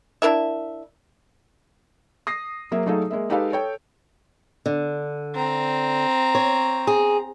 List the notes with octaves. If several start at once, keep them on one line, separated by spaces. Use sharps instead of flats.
D4 E4 A#4 E5
D#6 A#6 C7
F#3 A#3 G#4 E5
F#3 A3 D#4 G#4 A4 F5
G#3 A#3 E5
G#3 D#4 G4 A4 B4 F5
A4 C#5 G5
D3
C4 A#5
C#5
G#4